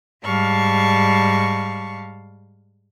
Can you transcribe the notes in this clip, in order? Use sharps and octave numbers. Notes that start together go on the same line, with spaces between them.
G#2 G3 F5 A5 C#6